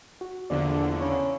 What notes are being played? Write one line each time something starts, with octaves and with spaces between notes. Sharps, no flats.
F#4
A#1 E2 D3 D5
C#3 C#5